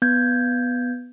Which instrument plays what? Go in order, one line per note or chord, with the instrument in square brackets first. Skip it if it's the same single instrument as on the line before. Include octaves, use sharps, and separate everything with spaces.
[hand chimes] B3 G6 G#6